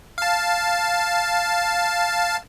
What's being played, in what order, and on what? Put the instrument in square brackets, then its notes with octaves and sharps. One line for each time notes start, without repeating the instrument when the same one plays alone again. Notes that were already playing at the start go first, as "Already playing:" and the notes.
[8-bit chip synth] F5 A5